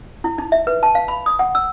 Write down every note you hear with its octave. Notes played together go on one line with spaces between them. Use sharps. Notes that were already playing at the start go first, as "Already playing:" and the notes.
E4
D#4
E5
B4
A5
F5
B5
D#6
F#5
E6